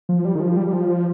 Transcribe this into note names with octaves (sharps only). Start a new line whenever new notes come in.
F3
G3
D#3
F3
G3
G3
F3